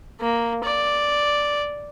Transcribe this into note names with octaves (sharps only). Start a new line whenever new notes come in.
A#3
D5